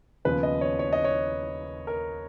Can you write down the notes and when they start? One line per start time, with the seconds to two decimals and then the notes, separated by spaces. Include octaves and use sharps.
0.25 D#2 C#3 F3 B3 B4
0.43 D#5
0.61 C#5
0.79 C#5
0.93 D#5
1.05 C#5
1.87 A#4